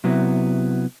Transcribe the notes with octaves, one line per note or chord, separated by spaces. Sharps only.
C3 F#3 B3 E4